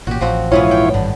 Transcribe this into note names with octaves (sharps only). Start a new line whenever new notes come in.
A1 A#2 F#4 G4
A1 F3 C4 F#4
A#1 G#2 E3 B3 C#4 E4 F4 C#5
G5
G#1 G2 D3